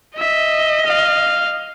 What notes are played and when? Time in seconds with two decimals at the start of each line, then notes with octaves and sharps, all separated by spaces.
0.18 D#5 E5
0.86 F5